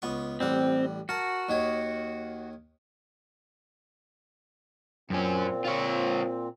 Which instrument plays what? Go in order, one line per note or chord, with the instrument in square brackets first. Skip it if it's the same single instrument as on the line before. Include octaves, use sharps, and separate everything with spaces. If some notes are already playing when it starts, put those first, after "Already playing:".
[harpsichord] C#2 B3 C#6
[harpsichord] A1 G3 F#5 [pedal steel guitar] C4
[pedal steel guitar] F#4 [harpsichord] A#4 A5
[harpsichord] D#2 D#3 C#5
[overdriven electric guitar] F#2 C#4 [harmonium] A#2 C4
[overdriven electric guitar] F4 C#5